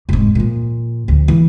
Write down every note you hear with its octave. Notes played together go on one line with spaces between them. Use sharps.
F1 G#2
A#2 F3
D2
E3